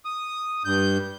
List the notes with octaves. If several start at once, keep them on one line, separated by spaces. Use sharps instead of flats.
D#6
G2 G6